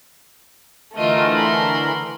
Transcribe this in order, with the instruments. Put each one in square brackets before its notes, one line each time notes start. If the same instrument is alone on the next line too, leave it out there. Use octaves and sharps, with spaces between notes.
[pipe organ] D3 E3 A#4 [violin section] A3 [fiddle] F4 D#5
[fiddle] B5 C6